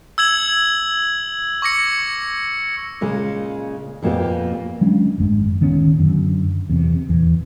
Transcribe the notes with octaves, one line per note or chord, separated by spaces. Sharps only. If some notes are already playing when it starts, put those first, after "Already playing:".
E6 G#6 F#7
C#6 D6 A#6 C#7
A#2 C#3 G#3
F2 A#2 A#3 B3 G4
F#3 G#3 C#4 D4
G#1 F#2 G#3
D1 D#3 B3 C#4
F#2 D3
E2 C3
D#1 E2 E3